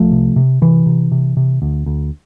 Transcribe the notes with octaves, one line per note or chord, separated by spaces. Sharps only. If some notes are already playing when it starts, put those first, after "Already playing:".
Already playing: C2 F3 A3
C3
C3
C3 E3
C3
C3
C3
D2
D2